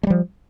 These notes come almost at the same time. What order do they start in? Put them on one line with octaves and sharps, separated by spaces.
G#3 G3 F3